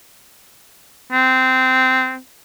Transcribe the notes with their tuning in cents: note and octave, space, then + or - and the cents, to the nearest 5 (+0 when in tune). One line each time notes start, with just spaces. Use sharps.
C4 -15